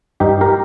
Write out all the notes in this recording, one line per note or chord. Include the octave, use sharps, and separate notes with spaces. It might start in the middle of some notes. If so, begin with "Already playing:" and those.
G2 D#4 G4
G4 A#4